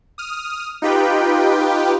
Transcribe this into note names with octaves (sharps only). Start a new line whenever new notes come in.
D#6 F6
D#4 F4 G4 B4 G5